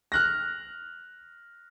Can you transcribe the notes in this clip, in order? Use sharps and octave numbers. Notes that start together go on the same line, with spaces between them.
F6 F#6 A#6